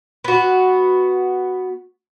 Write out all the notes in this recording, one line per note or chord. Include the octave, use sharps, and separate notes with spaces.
B3 F#4